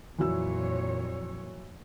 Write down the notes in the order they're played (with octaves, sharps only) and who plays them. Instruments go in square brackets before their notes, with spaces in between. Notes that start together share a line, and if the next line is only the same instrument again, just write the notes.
[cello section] F2 A#2 C#5 [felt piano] E3 F#3 E6